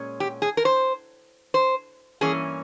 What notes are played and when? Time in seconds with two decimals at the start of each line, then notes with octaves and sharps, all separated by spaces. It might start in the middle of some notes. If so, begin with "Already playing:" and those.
Already playing: A#2 G#3 C#4
0.20 G4
0.42 G#4
0.57 A#4
0.65 C5
1.54 C5
2.21 G2 E3 A#3 C#4 G#4